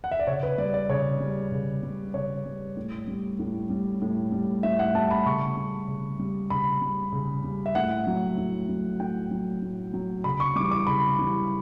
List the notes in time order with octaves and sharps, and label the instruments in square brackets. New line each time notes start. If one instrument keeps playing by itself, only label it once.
[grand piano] F#5
E5
D5
C#3 C#5
B4
G3 D5
D5
C#3 C#5
G3
C#3
G3
C#3 C#5
G3
A2
G3
A2
G3
A2
G3
A2 E5
F#5
G3 A5
B5
C#3 C#6
G3
C#3
G3
C#3 B5
G3
C#3
G3
E5
A2 F#5
F#3
A2
F#3
A2 G5
F#3
A2
F#3
C#3 B5
C#6
G3 D6
E3
D6
C#3 B5
E3 G3